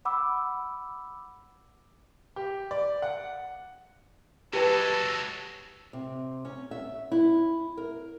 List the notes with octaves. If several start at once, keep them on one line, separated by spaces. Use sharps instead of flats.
F#5 B5 D6 E6
G4
D5
F#5
F#3 G#3 G4 A4 B4 A5
C3
C#4
E5
E4
A#4